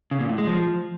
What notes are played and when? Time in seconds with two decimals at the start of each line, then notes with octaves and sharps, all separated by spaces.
0.11 C#3
0.20 A#2
0.29 A2
0.38 G#3
0.47 F3